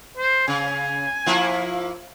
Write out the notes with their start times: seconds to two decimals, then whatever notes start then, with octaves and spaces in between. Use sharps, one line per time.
0.17 C5
0.48 C#3 G#5
1.26 F3 A#3 E4